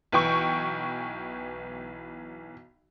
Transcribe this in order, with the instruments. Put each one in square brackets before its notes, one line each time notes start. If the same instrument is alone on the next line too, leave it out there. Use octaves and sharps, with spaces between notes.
[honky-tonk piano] B1 E3 G5 C#6